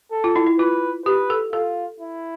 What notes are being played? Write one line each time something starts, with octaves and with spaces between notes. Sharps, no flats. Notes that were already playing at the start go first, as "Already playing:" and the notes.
A4
F4
E4
E4
F4 B4
G4 B4
A4
F4 A4
E4